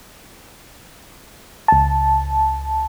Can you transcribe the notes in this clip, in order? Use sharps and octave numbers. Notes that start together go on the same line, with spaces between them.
C#2 A5